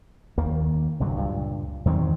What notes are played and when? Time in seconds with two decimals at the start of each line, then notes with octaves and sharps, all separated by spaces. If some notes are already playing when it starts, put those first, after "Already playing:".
0.38 D#2 D#3 A#3
1.00 C2 G2 D3 F#3
1.16 C#2 G2 A#2
1.85 E2 D#3 F#3 C4